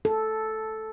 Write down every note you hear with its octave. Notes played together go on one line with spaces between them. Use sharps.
A4